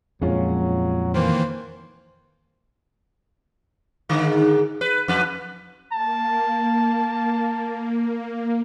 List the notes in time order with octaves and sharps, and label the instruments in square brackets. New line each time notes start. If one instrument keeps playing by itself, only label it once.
[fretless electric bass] F2 A#2 [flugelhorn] F#3 [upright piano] G#3 C#4 F4
[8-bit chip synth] D#3 E3 A#3 [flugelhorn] C5
[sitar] G#2 D3 D#3
B4
F2 B4
[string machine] A#3 [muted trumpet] A5